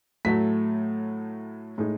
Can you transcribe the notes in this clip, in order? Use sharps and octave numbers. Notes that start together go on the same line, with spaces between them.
A2 F#3 A3 B6
A2 G#3 D#4